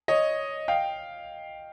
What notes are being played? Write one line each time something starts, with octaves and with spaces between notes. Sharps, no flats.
C#5 D#5
F5 G5